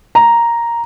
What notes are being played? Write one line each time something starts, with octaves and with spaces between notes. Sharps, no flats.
A#5